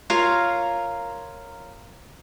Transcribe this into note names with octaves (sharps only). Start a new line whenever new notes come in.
F4 A#4 C#5 F5